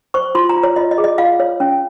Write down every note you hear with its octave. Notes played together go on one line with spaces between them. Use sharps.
C5 C#6
F4 C6
A#5
F4
C#5
F4 D#5
D#5
G#4
D#5
F4 F5
C#5
C#4